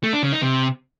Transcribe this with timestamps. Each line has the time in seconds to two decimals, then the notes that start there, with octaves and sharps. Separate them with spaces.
0.04 A3
0.13 D4
0.23 C#3
0.33 D#4
0.42 C3